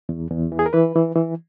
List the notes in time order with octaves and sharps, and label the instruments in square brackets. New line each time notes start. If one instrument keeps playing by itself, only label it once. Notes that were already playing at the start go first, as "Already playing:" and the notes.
[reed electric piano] E2
E2
E3
G#4
A#4
E3 B4
E3
E3